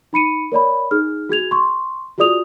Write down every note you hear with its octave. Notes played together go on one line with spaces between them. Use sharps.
D#4 B5 C#7 D#7
A#4 C#5 D5 B5
D#4 G#4 F6
F#4 G#4 G#6 F7
C6 C#6
F4 F#4 G#4 D5 D#6 F7